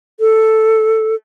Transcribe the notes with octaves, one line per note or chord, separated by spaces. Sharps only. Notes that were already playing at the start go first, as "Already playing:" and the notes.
A4